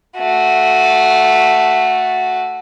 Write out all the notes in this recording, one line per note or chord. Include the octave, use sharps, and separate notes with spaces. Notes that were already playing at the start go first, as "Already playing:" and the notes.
A3 F#4